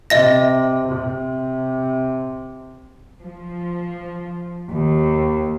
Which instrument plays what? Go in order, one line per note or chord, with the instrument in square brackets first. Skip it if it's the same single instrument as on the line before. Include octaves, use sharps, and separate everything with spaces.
[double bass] C3 [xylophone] D#5 E5 A#6
[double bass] C3
[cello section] F3
D#2